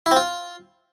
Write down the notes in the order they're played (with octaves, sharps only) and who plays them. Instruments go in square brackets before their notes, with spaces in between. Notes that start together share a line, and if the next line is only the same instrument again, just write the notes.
[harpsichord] E4
C4
F4